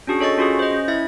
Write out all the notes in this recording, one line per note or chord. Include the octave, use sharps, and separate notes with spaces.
C#4 D4 F#4 G#4
A4 C#5 D#5 C#6 A6
C#4 F4 F#4 G#4
C5 D#5
C#4
E4 E5 G#6